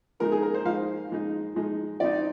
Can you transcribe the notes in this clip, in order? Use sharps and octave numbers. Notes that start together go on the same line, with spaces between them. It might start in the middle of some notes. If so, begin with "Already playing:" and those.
F3 G#3 D#4 A#4
G#4
A#4
C5
F3 G#3 D#4 F5
F3 G#3 D#4
F3 G#3 D#4
F3 C4 D#4 D5